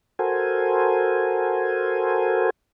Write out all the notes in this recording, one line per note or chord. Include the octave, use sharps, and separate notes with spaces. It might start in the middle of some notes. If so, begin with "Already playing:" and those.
F#4 A4 A#4 C5 G#5